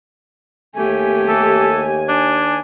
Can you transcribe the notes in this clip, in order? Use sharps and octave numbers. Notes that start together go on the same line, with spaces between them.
D#2 A3 G4 G#5
A4
D4